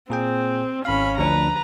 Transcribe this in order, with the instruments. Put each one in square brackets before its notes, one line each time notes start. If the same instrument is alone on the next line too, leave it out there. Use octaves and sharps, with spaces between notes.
[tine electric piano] A#2 G#4 G5 [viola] C4
[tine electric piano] G#1 F5 [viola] C#4 B5
[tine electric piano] D2 F3 D4 [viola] B4 A#5